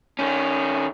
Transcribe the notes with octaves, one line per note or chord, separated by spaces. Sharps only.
D#3 C#4